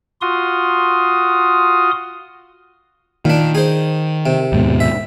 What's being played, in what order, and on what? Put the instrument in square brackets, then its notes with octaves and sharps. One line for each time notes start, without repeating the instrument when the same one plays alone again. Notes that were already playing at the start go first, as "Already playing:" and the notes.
[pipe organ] F4 F#4 C6 D#6
[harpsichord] A#2 D4 [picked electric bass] D#3
[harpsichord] G#4 C5
C3
[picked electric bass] D#2 G#2 B2
[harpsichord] E5